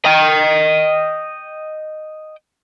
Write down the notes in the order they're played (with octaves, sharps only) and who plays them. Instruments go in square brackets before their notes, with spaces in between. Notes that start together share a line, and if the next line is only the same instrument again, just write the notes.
[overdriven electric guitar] D#5 G5